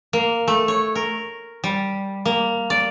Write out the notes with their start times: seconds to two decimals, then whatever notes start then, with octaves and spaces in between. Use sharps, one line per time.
0.13 A#3
0.48 A3
0.68 C#5
0.95 A#4
1.64 G3
2.25 A#3
2.70 D5